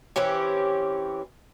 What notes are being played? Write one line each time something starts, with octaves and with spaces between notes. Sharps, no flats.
E3 C4 C#4 G4